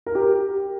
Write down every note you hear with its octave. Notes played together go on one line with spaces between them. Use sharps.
A#4
G4